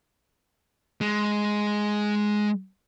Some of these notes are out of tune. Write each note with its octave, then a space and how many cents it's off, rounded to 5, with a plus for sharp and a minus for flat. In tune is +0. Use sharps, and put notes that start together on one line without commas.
G#3 +5